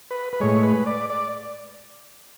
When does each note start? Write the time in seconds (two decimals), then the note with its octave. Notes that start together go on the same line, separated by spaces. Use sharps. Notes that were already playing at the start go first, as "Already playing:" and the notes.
0.11 B4
0.33 B4
0.40 A2 G#3 C#5
0.63 B4
0.86 D5
1.10 D5